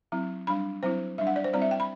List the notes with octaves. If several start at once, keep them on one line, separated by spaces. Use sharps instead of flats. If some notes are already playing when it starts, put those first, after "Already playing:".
F#3 C4 E4
G3 D4 B5
F#3 C4 E4 C5
G3 D4 E5
F#5
D5
C5
G3 C4 E4 D5
E5
G5
B5